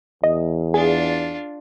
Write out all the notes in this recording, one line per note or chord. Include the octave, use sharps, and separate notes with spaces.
E2 D#5
D4 F4 G#4